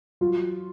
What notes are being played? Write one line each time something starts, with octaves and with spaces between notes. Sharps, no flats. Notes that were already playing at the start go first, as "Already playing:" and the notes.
F#3 F4